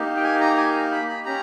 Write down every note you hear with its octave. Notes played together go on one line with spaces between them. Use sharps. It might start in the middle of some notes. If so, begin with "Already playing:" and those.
Already playing: A#3 D#4 G4
G5
G#5
A#5
G#5
B5
B5
C#4 G4 A#5